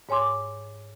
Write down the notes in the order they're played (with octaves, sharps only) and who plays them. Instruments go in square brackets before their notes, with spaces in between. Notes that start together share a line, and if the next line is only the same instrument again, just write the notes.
[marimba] G#2 C#5 G#5 C6 D6